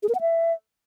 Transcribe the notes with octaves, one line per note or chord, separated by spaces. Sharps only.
G#4
A#4
F#5
E5